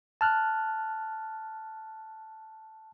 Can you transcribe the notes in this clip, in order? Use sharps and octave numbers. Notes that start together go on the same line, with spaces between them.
A5 F6 F#6